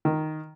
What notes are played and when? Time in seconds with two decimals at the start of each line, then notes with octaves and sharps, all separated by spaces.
0.05 D#3